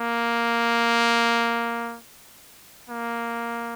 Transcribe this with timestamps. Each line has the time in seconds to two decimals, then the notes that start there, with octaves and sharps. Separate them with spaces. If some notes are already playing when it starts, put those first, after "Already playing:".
Already playing: A#3
2.90 A#3